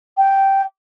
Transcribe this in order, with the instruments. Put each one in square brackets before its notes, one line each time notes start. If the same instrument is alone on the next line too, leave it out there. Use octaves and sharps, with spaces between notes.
[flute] G5